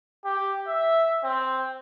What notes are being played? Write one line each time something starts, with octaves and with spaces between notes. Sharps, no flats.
G4
E5
C4